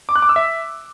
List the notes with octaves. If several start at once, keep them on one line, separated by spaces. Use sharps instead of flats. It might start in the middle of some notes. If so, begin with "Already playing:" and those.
D6
F#6
D6
E6
E5